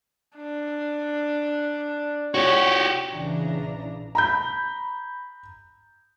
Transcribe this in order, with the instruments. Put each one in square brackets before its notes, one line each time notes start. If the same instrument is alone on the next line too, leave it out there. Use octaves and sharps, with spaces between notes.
[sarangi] D4
[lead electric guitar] F#4 G4 [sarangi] C#5
[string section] A#1 C#3 E3 D4 A#5
[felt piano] A#5 B5 G6